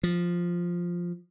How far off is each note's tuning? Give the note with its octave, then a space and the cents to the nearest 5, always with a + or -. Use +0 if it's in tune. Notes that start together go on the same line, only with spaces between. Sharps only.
F3 +0